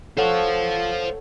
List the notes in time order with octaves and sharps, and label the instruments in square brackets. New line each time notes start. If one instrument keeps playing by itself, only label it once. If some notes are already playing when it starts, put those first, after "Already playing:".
[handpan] A4 C#5 F#5 [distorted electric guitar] C5 F5